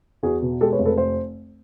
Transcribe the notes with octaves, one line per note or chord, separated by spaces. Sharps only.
E2 F#4 G#4
B2
G#3 G4 A4
B4 C#5
F1
A4 B4
C5